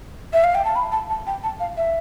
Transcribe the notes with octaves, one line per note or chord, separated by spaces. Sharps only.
E5
F5
G5
A5
B5
A5
A5
G5
A5
F5
E5